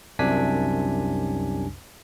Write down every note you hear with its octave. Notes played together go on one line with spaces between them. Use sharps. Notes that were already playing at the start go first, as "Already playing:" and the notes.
C2 F#2 C3 D4 G#5 B6